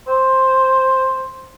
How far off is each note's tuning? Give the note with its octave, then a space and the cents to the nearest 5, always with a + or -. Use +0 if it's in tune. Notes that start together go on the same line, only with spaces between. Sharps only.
C5 +5